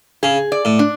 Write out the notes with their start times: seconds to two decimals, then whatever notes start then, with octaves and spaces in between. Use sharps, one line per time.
0.23 C#3 G#4
0.52 D5
0.65 A2
0.79 D4